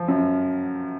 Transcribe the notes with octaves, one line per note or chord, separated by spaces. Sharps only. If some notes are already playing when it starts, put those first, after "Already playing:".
Already playing: F3
F#2